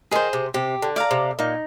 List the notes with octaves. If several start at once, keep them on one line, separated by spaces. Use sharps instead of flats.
D#3 G#4 C5
C3
C3 G4
D3
D5 F5 A#5
C3
A#2 D#4